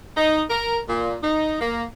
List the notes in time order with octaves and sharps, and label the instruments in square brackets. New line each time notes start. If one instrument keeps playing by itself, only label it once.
[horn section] D#4
A#4
A#2
D#4
A#3